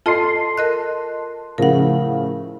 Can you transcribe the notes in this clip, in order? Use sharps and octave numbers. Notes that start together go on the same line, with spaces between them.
F4 A4 D#5 A5 C6 C7
A#4 D#5 F#6
A2 C#3 F3 A#4 F#5